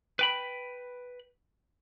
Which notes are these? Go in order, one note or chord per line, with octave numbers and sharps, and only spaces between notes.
B4 G5 B5